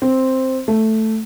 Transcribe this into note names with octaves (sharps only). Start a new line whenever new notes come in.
C4
A3